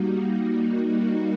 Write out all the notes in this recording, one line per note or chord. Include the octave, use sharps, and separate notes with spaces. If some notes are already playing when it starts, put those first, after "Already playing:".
Already playing: G3 A#3 D#4 F#4
G3 A#3 D#4 F#4